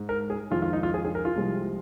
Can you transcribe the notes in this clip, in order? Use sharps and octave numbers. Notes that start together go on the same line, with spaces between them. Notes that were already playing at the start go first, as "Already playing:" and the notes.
Already playing: G#2 G#3
A#4
G#4
F2 D#3 G#3 F4
F4
D#4
F4
G#4
G#4
A#4
F4
C2 C3 F3 G#3